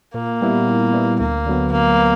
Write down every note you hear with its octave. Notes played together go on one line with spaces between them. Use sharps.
A#2 A#3
G3 B3 E4
A#2
G3 B3 E4
D2 A#3
D3 F#3 B3
D2 A#3
B3